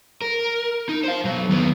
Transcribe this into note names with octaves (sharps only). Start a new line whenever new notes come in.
A#4
D#4
C5 F5
B1 F#3
D#2 B3